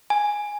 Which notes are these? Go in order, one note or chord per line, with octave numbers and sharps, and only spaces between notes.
G#5